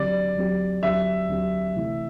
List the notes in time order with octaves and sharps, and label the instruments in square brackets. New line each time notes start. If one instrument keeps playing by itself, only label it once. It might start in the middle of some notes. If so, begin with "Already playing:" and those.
Already playing: [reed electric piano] D2 D3 F#3 C4 G4 [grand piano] D5
[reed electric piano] D2 D3 F#3 C4 G4
[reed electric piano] D2 D3 F#3 C4 G4 [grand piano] E5
[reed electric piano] D2 D3 F#3 C4 G4
C3 E3 A3 C4 E4